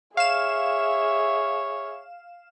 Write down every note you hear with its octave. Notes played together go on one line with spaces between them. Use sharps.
G#4 C#5 E5 F5 E7